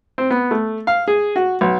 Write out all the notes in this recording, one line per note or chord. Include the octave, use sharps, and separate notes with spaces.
C4
B3
A3
F5
G#4
F#4
B1